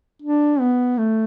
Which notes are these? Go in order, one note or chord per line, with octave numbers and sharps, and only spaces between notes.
D4
B3
A3